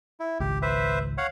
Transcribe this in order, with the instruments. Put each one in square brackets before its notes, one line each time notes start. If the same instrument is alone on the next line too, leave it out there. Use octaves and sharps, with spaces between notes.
[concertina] E4
[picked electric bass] G#1 C#2 [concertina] G4
[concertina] B4 C5 E5
C#5 F5 F#5